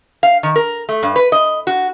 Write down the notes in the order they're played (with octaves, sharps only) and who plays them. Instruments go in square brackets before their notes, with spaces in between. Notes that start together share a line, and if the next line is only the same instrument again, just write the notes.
[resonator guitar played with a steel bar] F5
D#3
A#4
A3
G2
B4
D#5
F#4